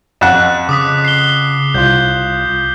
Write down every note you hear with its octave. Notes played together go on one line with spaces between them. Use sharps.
F2 F#5 F#6 E7
C#3 D6 D#6 B6
C7 G7
C2 F4 G6